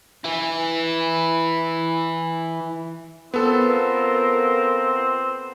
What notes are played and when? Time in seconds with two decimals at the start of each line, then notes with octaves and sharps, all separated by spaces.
0.24 E3 E4
3.34 B3 C4 F4 A4 A#4